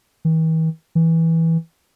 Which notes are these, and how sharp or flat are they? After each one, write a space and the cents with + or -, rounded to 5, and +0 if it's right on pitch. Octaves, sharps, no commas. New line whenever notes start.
E3 -45
E3 -10